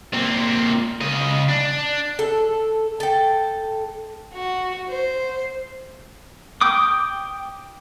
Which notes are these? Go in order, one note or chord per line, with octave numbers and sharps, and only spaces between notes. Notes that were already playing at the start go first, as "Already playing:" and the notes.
A#2 C4
C#3 D#5
D4
A4
A4 G5
F#4
C5
G5 D6 D#6